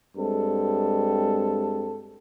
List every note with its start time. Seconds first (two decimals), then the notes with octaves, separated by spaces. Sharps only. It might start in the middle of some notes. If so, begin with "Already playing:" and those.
0.16 G2 G#3 C4 A4